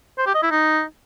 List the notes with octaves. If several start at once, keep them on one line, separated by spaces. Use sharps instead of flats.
C5
G4
D#5
E4
D#4